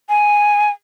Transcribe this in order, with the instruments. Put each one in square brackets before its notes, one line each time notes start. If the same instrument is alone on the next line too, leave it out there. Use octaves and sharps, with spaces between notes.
[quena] G#5